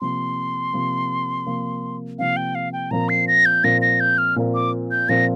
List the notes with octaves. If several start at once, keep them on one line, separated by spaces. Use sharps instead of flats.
C3 F3 A#3 C6
C3 F3 A#3
C3 F3 A#3
C3 F3 A#3 F5
G5
F5
G5
A#2 F3 C4 A#4 A#5
C7
A#6
G6
A#2 F3 C4 A#4 A#6
A#6
G6
F6
A#2 F3 C4 A#4
D6
G6
A#2 F3 C4 A#4 A#6